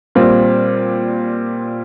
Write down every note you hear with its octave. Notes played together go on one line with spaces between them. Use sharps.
A#2 G3 C4 F4